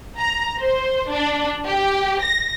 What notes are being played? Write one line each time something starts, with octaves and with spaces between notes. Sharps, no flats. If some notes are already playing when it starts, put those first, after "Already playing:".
A#5
C5
D4
G4
A#6